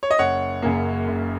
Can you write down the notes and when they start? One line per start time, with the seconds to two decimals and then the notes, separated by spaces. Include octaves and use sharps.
0.03 C#5
0.11 D#5
0.19 F#1 C#5 F#5
0.62 F#2 C#3 A#3
1.08 F#1